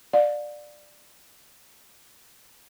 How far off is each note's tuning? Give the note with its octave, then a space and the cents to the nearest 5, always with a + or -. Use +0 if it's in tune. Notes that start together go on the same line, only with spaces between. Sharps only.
D5 +15 F5 +40